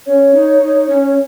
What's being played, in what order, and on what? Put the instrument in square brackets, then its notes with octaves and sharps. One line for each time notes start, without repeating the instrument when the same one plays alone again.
[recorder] C#4 [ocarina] C#5
[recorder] D#4
D#4
C#4